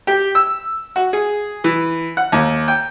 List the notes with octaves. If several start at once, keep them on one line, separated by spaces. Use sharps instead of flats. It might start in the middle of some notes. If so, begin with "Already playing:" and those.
G4
E6
F#4
G#4
E3
F#5
D#2
G5